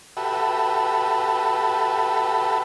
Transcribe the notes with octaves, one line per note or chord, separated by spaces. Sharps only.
F#4 G4 A4 B4 E5